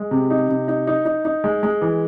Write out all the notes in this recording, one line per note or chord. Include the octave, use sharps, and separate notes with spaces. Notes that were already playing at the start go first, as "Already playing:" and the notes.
Already playing: G#3
C3
D#4
C3
D#4
D#4
D#4
D#4
G#3
G#3
E3